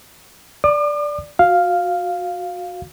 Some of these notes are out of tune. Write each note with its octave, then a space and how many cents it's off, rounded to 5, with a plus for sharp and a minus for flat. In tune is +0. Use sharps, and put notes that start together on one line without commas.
D5 -5 D6 +40
F#4 -20 F5 +0